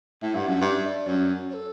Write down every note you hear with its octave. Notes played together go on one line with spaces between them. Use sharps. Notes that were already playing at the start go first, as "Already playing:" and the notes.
A2 E5
G2 F#5
F#2 E5
G2 E5
D5
F#2 C#5
C#5
A4